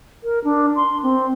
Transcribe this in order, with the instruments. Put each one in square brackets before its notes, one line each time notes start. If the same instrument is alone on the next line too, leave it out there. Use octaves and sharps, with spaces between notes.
[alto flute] A#4
D4
C6
C4